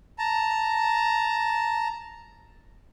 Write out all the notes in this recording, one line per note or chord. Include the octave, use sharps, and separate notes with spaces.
A5 A#5